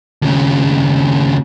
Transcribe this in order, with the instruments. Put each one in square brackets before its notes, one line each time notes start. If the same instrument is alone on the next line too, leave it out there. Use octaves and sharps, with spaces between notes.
[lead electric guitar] D#2 C#3